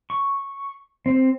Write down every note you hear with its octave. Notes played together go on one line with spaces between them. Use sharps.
C#6
C4